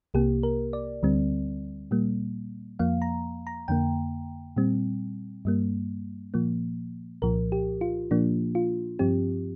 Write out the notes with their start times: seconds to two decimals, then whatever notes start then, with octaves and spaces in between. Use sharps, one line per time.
0.14 C2 C3 A#3 G4
0.43 A#4
0.73 D5
1.03 D2 D3 G3 C4
1.91 A#2 G3 A#3
2.79 F2 F3 A#3 F5
3.02 A#5
3.47 A#5
3.68 F2 D3 A#3 G5
4.56 A#2 G3 C4
5.45 G2 G3 A#3
6.34 A#2 F3 A#3
7.22 C2 A#2 F3 A#4
7.52 G4
7.81 F4
8.11 A#2 F3 A#3 D4
8.55 F4
8.99 G2 F3 C4 G4